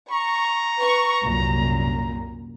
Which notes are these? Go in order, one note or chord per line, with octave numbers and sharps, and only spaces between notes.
A#5 C#6
B4 C#6
C2 F#2 A#2